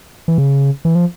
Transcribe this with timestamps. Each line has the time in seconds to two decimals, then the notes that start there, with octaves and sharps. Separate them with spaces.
0.28 E3
0.38 C#3
0.85 E3
0.95 F3